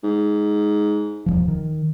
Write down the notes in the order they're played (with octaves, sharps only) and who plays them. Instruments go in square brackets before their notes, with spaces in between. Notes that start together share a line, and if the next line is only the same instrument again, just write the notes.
[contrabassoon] G#2
[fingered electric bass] D#1 G#1 F3
D#3